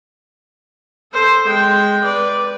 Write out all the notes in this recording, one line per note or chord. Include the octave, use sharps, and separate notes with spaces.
A4 C5
G#3 G5
B4 D5